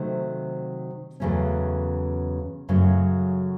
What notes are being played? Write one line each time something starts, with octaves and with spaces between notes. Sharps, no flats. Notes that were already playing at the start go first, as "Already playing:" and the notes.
Already playing: C3 D#3 F#3 A3 C4
E2 C#3 F#3 A3 C#4
F#2 C#3 F#3 A3